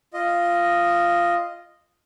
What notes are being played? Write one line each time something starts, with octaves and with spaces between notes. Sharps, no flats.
F4 D#5